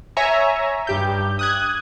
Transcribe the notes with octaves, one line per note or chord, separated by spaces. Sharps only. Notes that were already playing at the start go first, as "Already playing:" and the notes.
C#5 E5 G#5 A#5 C#6
G2 G4 G6
D#6 F#6 G#6